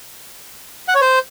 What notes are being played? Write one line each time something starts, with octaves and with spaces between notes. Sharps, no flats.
F#5
C#5
C5